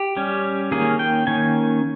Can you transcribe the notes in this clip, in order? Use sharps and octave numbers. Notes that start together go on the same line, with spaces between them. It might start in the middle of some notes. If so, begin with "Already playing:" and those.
Already playing: G4
G3 C#4
D#3 A#3 C#4 G#4
G5
D#3 A#3 C#4 G#5